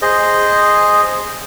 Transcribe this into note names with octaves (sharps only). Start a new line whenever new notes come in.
G#4 C5 D#5